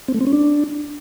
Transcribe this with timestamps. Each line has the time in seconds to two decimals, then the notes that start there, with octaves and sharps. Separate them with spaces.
0.08 C4
0.14 A3
0.21 C4
0.27 C#4
0.33 D4